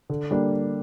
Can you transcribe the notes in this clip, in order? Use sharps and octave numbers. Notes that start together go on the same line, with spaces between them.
D3
G3 A#3 D4